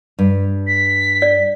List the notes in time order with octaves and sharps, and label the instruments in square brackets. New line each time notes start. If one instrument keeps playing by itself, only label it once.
[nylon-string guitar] G2
[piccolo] B6
[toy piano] D5